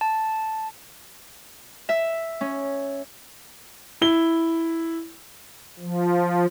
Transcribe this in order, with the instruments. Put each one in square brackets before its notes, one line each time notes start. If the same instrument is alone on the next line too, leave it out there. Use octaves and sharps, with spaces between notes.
[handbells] A5
[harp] E5
C#4
[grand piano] E4 G7
[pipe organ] F3